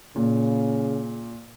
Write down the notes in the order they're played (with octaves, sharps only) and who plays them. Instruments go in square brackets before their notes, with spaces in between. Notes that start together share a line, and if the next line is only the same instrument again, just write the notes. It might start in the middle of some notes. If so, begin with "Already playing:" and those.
[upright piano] A#2 [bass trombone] C#3